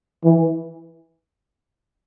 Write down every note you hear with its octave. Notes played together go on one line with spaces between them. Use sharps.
E3